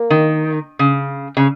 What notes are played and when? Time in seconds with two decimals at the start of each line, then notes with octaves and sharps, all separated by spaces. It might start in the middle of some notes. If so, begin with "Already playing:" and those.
Already playing: A#3
0.10 D#3
0.79 C#3
1.37 C#3